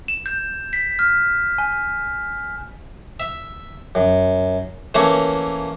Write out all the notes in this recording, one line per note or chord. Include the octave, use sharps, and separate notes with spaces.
E7
G6
B6
F6
G#5
E5
F#2
E3 A3 A#3 C#4